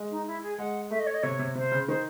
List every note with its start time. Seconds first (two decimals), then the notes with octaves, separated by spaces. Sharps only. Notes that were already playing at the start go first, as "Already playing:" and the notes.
Already playing: G#3
0.11 D#4
0.27 E4
0.42 G#4
0.58 G#3 F#5
0.90 A3 E5
0.99 D#5
1.06 C#5
1.14 D#5
1.23 C3 C#5
1.39 C3
1.55 C3 C5
1.72 C#3
1.88 D#3 C5